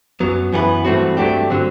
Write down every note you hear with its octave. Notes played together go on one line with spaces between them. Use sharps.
F#2 F#3 B3
F#2 E3 B3 F#4 B4
G2 E3 A3 C4 F#4
G2 F#3 A3 D4 G4
D3 F#3 C4